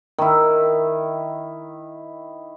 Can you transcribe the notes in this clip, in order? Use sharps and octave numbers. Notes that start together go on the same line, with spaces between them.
D#3 E4